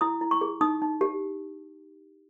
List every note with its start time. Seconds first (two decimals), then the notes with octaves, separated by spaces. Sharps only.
0.01 E4 D#6
0.21 E4
0.31 C#6
0.41 G#4
0.61 D#4 D#6
0.82 D#4
1.01 G4